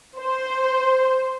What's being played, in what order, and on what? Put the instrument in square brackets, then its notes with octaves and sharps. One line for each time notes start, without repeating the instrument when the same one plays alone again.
[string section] C5